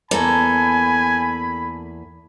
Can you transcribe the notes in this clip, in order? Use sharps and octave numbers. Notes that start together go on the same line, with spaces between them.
E2 A#3 A4 D5 G#5 B5